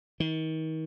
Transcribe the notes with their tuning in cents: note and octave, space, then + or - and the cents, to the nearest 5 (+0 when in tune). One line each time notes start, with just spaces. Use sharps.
D#3 +35